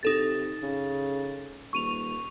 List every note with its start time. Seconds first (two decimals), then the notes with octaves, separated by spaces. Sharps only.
0.03 C3 D#4 A4 A6
0.63 C#3
1.73 D#1 C#6 D#7 F7